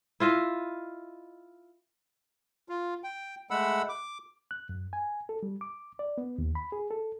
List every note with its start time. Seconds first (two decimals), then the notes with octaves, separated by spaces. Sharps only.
0.20 E4 F4 D#5 E5
2.69 F4
3.04 G5
3.51 G#3 A3 F#5 B5 E6
3.89 D6
4.51 F#6
4.69 F#2
4.93 G#5
5.29 A4
5.43 G3
5.61 D6
5.99 D5
6.18 B3
6.38 D#2
6.55 B5
6.72 G#4
6.91 A4